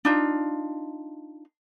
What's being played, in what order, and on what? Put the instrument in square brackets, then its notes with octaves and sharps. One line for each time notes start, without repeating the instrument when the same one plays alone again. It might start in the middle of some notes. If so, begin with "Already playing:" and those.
[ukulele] D4 D#4 F4